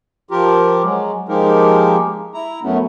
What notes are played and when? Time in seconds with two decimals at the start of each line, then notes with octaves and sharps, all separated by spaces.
0.31 F3 F4 G4 A#4
0.84 F#3 G#3
1.28 F3 G#3 A#3 D#4 G4 A#4
2.34 E4 A#5
2.63 F#2 F#3 A3 B3 C#4